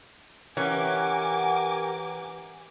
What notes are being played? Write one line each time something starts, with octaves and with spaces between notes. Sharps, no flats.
E3 C#4 G4 A#4 F#5 G#5 D6